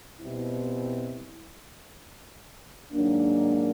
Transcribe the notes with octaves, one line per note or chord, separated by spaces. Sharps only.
B2 G3 C4 E4
G#2 D#3 F#3 A#3 D4